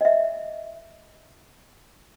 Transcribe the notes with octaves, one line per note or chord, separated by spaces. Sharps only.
D#5 E5